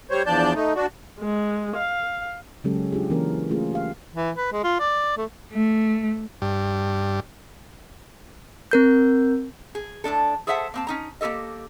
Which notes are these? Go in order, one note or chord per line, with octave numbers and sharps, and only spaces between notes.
G3 C5 C#5
E2 F3 D4 D5 A5 G6
A3 D#4
D4 F#4
G#3
F5
C#3 F#3 G#3 C#4 G4 A4
D4 F4 G4 G#4
E3 A#3 C#4 A#4
G#3 A3 C#4 F4 G#4
G4 F5
E3
B4
G#3
F4
D5
A3
A3
G2
C4 A#4 G6
G#4
A2 C#3 D4 A4
G#4 A4 C5 E5 F#5 A5
A#3 C4 A5
C#4 D#4 A#5
A#3 F4 G4 A4 D#5